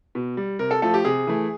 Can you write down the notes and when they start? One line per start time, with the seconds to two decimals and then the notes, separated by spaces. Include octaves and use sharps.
0.15 B2
0.37 G3
0.59 C3 A#4
0.71 A4
0.82 F3 A3 A4
0.94 G4
1.05 C3 G#4
1.27 E3 A3